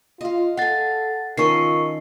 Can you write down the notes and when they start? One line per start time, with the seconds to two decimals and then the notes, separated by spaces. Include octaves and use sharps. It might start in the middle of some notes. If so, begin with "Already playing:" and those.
0.21 F4 D#5 F5
0.57 A4 F5 F#5 G#5 A6
1.38 D#3 C#4 F4 A4 A#4 C#6 C7